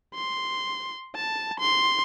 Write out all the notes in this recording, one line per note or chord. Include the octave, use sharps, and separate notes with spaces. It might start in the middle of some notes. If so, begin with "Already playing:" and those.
C6
A5
C6